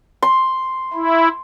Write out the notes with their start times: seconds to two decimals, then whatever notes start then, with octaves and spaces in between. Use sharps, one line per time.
0.22 C6
0.93 E4